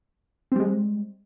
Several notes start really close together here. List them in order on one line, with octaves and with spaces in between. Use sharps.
C4 G3 G#3